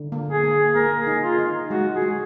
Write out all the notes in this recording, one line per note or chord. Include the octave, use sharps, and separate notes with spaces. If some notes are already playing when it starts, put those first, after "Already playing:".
Already playing: D3
A#3
G#4
A#3
A#3 A#4
G#4
D#4
F4
D#4
G#3 F#4
G#4
G#3